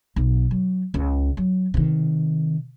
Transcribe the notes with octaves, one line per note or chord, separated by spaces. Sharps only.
B1
F#3
C#2
F#3
C3 D#3